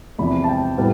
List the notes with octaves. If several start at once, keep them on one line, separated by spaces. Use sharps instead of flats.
E2 C3 F3 B5
A5
G5
A2 G3 B3